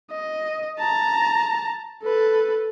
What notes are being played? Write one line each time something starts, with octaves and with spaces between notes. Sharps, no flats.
D#5
A5 A#5
A4 B4